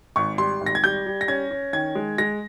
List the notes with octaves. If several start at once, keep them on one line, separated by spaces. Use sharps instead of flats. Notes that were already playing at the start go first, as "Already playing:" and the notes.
G#1 C#6
G3 C6
G#1
A#6
G#6
G3 G6
G3
A#6
C#4 G#6
C#4
D#3 G#6
G#3
G#3 A#6